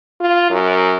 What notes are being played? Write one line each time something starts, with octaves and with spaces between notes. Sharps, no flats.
F4
F#2